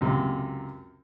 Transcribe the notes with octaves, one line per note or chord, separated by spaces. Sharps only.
C#2 F#2 C3